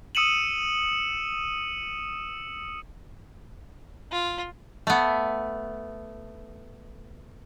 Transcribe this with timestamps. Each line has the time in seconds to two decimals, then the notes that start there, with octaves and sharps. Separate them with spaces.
0.15 D#6 E6 C#7 D#7 E7 F#7
4.12 F4
4.87 A3 B3